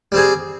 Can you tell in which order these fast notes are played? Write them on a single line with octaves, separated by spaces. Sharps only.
G3 C4 G#4